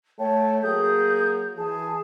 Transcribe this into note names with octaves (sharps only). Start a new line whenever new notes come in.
A3 C#5 G5 A5
F#3 A#3 G#4 D#6 G6
E3 G#4 A5